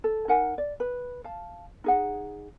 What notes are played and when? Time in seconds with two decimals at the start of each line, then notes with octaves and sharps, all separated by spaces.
0.04 A4
0.28 D#4 A#4 F#5 G#5
0.58 D5
0.80 B4
1.24 F5 A5
1.84 D#4 G#4 F#5